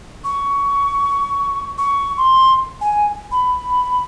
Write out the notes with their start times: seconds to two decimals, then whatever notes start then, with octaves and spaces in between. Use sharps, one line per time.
0.24 C#6
1.78 C#6
2.17 C6
2.81 G#5
3.32 B5